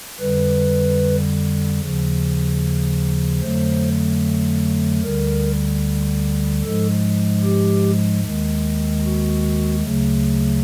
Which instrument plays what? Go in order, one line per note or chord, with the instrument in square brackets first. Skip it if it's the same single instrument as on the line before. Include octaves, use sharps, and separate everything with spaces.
[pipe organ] F2 D3 G3 B4
D#2 C#3 F3
F2 D3 F#3 A3 C5
D2 D3 G3 A#4
G#2 F3 G#3 A4
G4
D#2 D#3 G#3
F#4
D2 C#3 F#3 A3